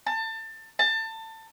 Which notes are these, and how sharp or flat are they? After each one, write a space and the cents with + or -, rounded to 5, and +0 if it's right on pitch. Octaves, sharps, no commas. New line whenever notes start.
A5 +25
A5 +25